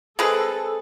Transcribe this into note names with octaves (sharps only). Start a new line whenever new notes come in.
G#3 C4 G#4 A4 B4